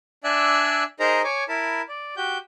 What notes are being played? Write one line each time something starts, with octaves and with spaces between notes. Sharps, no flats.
D4 D5 E5 G#5 E6 F#6
D#4 G#4 A#4 C5 D#5 A#5
C#5 G#5 D6
E4 A#4 A5 B5
D5
F#4 G4 G6